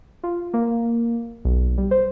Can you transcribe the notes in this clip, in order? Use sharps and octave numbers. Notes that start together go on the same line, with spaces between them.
F4
A#3
B1
G3
C5